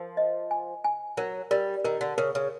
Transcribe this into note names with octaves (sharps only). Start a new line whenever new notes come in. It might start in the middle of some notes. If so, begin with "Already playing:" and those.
Already playing: F3 A#4
D#5
G#5
G#5
F#3 A#4
G3 A#4
D#3 A#4
D3
C#3 A#4
C#3